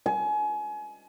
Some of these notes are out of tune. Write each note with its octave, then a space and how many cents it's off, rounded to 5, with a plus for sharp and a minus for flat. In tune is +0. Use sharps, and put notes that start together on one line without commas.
G#5 +30